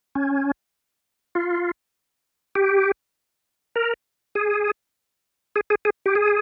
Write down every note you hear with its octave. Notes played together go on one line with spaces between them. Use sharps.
C#4
F4
G4
A#4
G#4
G#4
G#4
G#4
G4
G#4